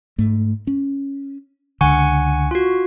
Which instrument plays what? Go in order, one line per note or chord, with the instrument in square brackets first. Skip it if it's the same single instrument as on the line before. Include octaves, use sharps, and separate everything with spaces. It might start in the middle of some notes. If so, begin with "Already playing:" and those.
[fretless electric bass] G#2 A3
C#4
[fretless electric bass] C#2 D3 [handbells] F#5 G#5 C#6
[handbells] F4 F#4